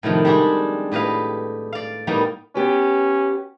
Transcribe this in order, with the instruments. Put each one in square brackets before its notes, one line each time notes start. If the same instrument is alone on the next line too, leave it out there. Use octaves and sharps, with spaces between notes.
[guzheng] A2 C3 D#3 F3
G3 G#3 C4 D4 G4 G#4
A2 G4 B4 D#5 F5
D5 F5
A2 G3 A#3 B3 D#4
[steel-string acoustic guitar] B3 G4 B4 [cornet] C#4